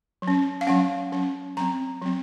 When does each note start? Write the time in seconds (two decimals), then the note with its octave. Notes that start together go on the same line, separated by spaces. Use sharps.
0.22 F#3
0.28 C#4
0.61 F5
0.67 F#3 C#4 F#5
1.12 F#3 C#4
1.57 F#3 C4 A#5
2.01 F#3 C4